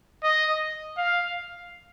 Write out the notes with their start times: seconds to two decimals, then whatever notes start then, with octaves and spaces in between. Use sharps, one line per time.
0.24 D#5
0.98 F5